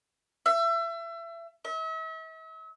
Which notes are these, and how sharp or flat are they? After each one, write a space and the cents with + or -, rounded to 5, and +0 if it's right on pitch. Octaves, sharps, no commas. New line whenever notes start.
E5 +30
E5 -40